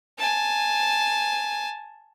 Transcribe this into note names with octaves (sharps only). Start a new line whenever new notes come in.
G#5 A5